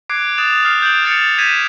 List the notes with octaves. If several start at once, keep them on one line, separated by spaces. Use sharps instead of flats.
D6 F#6 G#6 C7 D7
D#6 F#6 A6 E7 F7
D#6 F6 C7
G6 D7 F7 F#7
G6 A6 C7 C#7 E7 F7
G6 G#6 B6 D#7 E7